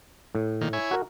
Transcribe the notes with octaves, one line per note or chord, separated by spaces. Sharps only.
A2
A#2 D#3
E4 C#5 G#5
F#4 A#4